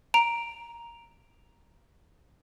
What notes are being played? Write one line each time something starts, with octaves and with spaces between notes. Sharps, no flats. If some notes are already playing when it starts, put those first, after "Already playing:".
A#5 D7